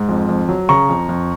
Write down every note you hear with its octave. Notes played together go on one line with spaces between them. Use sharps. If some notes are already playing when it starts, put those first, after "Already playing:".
Already playing: G#2
F2
F2
F#3
C#3 A#5 C#6
F2
F2